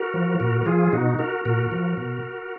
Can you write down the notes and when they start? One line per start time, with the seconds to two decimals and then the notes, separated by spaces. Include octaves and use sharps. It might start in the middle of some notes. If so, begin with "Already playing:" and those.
Already playing: F#4 A#4
0.14 F3
0.40 A#2 F#4 A#4
0.61 A#4
0.66 F3 F4 G#4
0.92 B2 D#4 F#4
1.19 F#4 A#4
1.45 A#2 F#4 A#4
1.71 F3
1.97 B2